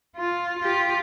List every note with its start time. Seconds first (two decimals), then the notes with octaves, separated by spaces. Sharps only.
0.17 F4
0.59 F4 G4